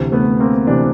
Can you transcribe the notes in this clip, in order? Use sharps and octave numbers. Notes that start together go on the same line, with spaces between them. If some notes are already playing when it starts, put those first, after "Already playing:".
Already playing: D2 C3 E3
A3 B3
A#3 C4
C3 E3 C4 D4